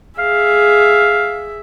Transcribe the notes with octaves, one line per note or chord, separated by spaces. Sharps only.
G#4 E5 F5